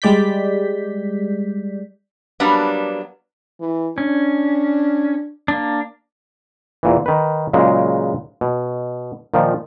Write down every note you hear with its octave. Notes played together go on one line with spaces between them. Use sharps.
G3 G#3 D5 G6 B6
F#3 G3 A#3 B3 D4
E3
C#4 D4
A#3 D4
E2 A#2 E3
D#3 B4
A#2 C#3 F#3 G#3
B2
A#2 D#3 F3